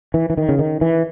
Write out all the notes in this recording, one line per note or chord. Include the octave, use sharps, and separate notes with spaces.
E3
E3
D#3
C#3
D#3
E3